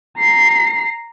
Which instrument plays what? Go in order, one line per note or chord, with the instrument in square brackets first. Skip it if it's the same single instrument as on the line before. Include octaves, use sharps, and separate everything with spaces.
[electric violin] A#5 C7